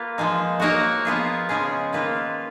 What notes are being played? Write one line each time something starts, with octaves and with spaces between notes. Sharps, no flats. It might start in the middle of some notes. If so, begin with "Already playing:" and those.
Already playing: A#3 F4 B4
F3 G#3 D#4
A#3 D#4 F#4 A#4 C#5
F3 B3 F4 G#4
C#3 F3 G#3 C#4 G#4
D#3 A#3 F4 B4